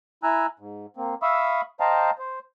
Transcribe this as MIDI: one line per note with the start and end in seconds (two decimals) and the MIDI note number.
0.23 0.46 64
0.23 0.46 80
0.23 0.46 82
0.23 0.46 88
0.23 0.46 90
0.59 0.86 44
0.97 1.15 58
0.97 1.15 60
1.22 1.61 76
1.22 1.61 77
1.22 1.61 83
1.22 1.61 85
1.22 1.61 87
1.22 1.61 88
1.80 2.11 72
1.80 2.11 75
1.80 2.11 77
1.80 2.11 79
1.80 2.11 81
1.80 2.11 82
2.19 2.39 72